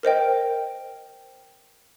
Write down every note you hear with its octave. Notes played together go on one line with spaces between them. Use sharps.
A#4 C5 D#5 G5